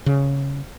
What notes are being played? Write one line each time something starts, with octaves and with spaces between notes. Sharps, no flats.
C#3